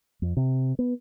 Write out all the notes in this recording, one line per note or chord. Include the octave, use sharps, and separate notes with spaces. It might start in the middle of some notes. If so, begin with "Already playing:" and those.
F2
C3
B3